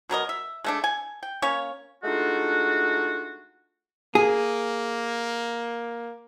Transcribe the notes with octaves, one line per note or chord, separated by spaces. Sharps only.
B2 F#3 A#4 D#5
E5
G#3 A3 D4
G#5
G5
A#3 C#4 C#5 F5
G#3 A3 D4 D#4 F4 F#4
A#3 G#4